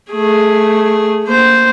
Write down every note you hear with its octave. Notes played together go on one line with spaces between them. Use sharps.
A3 G#4
A#3 C5